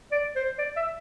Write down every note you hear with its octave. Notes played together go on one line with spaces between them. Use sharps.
D5
C5
D5
E5